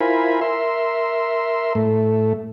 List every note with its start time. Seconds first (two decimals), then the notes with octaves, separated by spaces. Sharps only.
0.01 E4 F4 A#4 C5 G#5 B5
0.41 A#4 E5 C6
1.75 A2 A3